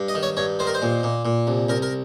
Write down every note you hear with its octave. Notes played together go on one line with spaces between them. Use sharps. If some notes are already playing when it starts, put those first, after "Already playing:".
Already playing: G2
D#5
D#3
C#5
G2 C#5
D#3 C5
A#4
C5
A#2
A#2
A#2
C2
C2 A#4
A#4